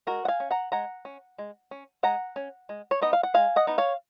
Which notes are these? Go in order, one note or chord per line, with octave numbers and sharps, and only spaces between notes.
G#3 F#4 A#4
F#5
F5 G#5
C#4
F#5 A#5
G#3 F#5 A#5
C#4
G#3
C#4
G#3 F#5 A#5
C#4
G#3
C#5
B3 D#4 D#5
F5
F#5
G#3 F5 G#5
D#5 F#5
B3 D#4
C#5 F5